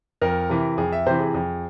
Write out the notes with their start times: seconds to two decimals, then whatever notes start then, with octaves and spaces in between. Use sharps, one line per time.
0.22 F2 A#4
0.50 C3 E3
0.78 F2 G#4
0.92 E5
1.06 C3 E3 C5
1.20 G#4
1.34 F2